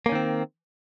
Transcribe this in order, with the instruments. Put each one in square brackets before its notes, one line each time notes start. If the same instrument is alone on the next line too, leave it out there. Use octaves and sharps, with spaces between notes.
[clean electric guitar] A#3
C#4
D#3
C4